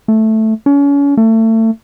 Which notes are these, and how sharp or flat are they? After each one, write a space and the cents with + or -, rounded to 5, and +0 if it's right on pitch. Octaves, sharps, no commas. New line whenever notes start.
A3 +0
C#4 +35
A3 +30